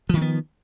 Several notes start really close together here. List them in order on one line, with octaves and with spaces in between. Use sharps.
F3 D#3 A#3 B3